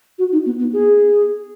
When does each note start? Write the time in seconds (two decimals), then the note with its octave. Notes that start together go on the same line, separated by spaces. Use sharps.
0.19 F#4
0.32 D#4
0.46 B3
0.59 B3
0.73 G#4